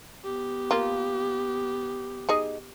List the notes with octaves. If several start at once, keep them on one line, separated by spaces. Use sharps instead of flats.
B3 G4
A#3 F4
D#4 G#4 D#5